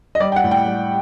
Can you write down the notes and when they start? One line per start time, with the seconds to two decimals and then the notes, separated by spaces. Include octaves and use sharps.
0.15 D#5
0.20 G3 D5
0.32 G5
0.36 F#5
0.44 A2
0.51 G5
0.66 G3